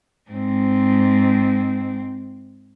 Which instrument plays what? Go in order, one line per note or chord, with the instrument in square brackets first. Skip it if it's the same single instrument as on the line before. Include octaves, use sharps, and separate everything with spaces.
[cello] G#2 C4